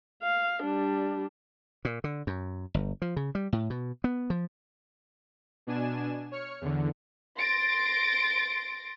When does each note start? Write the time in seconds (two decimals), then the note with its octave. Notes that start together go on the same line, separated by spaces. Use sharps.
0.23 F5
0.62 G3 D4
1.85 A#2
2.04 D3
2.27 F#2
2.74 G1
3.02 F3
3.17 C#3
3.35 G3
3.53 A2
3.70 B2
4.04 B3
4.30 F3
5.67 B2 D4 G#5 E7
6.32 C#5 F6 C#7
6.61 E2 D3
7.39 C6 A6 A#6 D7